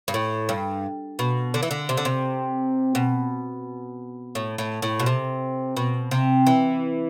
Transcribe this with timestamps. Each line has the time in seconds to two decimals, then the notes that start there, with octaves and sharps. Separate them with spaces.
0.08 G2
0.14 A2
0.49 G2
1.19 B2
1.54 D3
1.63 E3
1.71 D3
1.89 C3
1.97 D3
2.05 C3
2.95 B2
4.35 A2
4.58 A2
4.82 A2
5.00 B2
5.06 C3
5.77 B2
6.11 C3
6.47 E3